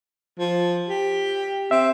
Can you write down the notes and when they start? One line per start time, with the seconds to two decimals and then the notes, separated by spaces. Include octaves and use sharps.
0.39 F3
0.89 G4
1.71 C4 E5